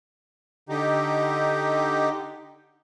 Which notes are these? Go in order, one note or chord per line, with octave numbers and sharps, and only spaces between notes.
D3 D#4 G4